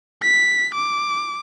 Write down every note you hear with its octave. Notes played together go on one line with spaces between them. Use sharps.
B6
D6